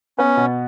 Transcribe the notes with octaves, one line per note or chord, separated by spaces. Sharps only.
B3 C#4
B2